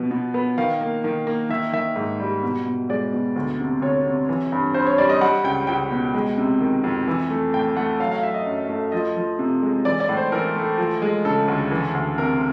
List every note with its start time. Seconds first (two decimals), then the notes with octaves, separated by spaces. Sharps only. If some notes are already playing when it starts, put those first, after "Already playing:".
Already playing: B2 F3 B3
0.11 B2
0.34 B3
0.58 D#3 F5
0.81 A#3
1.04 D#3
1.27 A#3
1.49 D#3 E5
1.73 D#3 E5
1.96 G#2
2.20 G3
2.43 B2
2.66 B2
2.89 G#3 D5
3.13 B2
3.36 D2
3.59 C3
3.82 D2 C#5
4.06 C3
4.29 E3
4.52 G2
4.74 G2 C5
4.87 C#5
4.98 G3 D5
5.09 D#5
5.21 G3 F#5
5.44 C#2 G5
5.67 C#2 G5
5.91 B2
6.14 G#3
6.38 C3
6.60 D#3
6.84 F2
7.08 E3
7.30 A3
7.54 A2 G5
7.76 A3 F#5
7.99 F#3 F5
8.11 F5
8.23 F#3 E5
8.34 D#5
8.46 F#2
8.69 A3
8.92 F3 D#5
9.16 F3
9.39 C3
9.62 G#3
9.85 E3 D5
10.00 D5
10.09 A2
10.17 C5
10.32 E3 A#4
10.55 A3
10.78 F3
11.02 G#3
11.25 C#3 A4
11.48 D2
11.71 E3
11.94 D2
12.18 C3 A#4